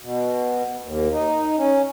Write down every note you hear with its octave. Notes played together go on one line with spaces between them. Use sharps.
B2
D#2
D#4
C#4